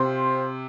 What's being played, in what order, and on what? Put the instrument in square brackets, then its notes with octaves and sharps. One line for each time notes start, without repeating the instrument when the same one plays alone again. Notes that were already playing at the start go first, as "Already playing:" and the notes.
Already playing: [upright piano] C3 [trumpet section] C4 F4 C5